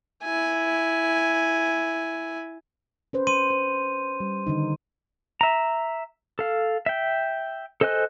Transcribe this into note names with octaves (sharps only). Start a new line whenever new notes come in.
E4 G#5
C#4 B4 C5
C6 D#7
C5
G3
D3 D#3 D#4
E5 A#5
A4 F5
E5 G5
A4 C5 D#5 G#5 F#6